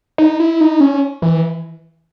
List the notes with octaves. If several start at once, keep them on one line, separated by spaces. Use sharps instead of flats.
D#4
E4
D#4
C#4
E3